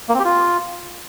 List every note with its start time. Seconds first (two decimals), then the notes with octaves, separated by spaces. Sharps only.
0.09 A#3
0.14 C4
0.19 G4
0.25 F4